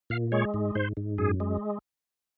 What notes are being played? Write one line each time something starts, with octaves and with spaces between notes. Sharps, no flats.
A#2 F5
G#3 C#5
G#2
G#2 C5
G#2
F#2 G#4
G#3